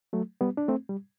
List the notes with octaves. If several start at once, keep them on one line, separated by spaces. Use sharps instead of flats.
F#3 A3
G3 B3
D4
A3 C4
G3